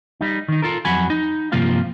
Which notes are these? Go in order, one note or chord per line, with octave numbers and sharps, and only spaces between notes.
G3 D#4
D#3 D#4
F4 A4 A#4
F2 F#3 F#5 G#5 B5
D#4
G2 C3 F3 A#3 F4 F5